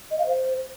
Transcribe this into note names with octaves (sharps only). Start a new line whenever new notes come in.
D#5
F5
C5